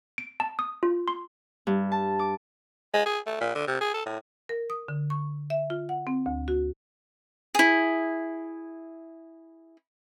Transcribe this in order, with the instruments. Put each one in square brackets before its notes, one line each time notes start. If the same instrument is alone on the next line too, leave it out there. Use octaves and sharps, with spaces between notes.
[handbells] D7
A5
D#6
F4
C6
[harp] G2
A5
D6
[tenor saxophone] G#3
G#4
A3
A#2
D3
C3
G#4
A4
A2
[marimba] A#4
D#6
D3
C#6
E5
F4
F#5
C4
D2
F#4
[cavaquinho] E4 G#4